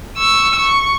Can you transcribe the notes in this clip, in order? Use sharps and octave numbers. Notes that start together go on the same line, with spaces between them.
C#6 E6
C#6